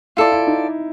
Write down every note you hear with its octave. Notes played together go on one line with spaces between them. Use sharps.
E4 F4 A4 D5
E4
D#4